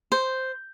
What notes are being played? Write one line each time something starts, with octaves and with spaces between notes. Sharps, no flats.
C5